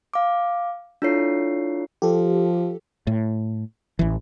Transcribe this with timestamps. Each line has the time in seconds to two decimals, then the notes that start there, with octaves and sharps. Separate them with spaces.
0.14 F5 D6
1.02 D4 E4 F4 A4 C#5 C7
2.02 F3 G4 A4
3.07 A2
3.99 A1 E3